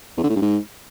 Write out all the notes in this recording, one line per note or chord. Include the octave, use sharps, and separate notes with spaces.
E2
D3
A2
G2
G#2